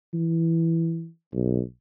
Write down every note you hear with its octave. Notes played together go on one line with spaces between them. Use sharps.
E3
B1